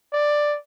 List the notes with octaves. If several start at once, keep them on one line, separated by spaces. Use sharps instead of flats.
D5